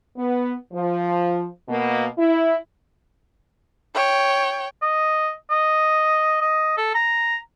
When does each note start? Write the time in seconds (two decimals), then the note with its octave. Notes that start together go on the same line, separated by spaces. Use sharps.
0.17 B3
0.73 F3
1.68 B2 A#3
2.17 E4
3.94 C#5 G5
4.82 D#5
5.50 D#5
6.41 D#5
6.77 A4
6.95 A#5